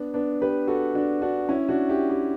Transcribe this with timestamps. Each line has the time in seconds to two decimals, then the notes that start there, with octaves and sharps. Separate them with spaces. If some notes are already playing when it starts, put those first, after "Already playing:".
Already playing: B3 D4
0.14 B3 D4
0.41 G4 B4
0.67 F#4 A4
0.95 D4 F#4
1.22 D4 F#4
1.49 C#4 E4
1.69 D4 F#4
1.89 E4 G4
2.09 E4 G4